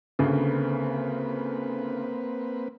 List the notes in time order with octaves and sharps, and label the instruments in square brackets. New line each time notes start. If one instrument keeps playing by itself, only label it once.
[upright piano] D2 C#3 [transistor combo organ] A#3 C4 B4